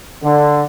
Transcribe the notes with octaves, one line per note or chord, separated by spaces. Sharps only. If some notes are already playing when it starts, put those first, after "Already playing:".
D3